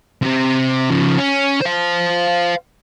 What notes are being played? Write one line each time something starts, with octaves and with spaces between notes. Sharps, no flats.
C3 C4
C#3 F3
C#4
C5 F5